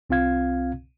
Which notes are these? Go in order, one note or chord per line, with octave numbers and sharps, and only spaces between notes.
C2 C4 F4 F5 G#6